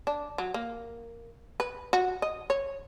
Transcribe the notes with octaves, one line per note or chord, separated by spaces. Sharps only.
D4
F#3
A#3
B4
F#4
D#5
C#5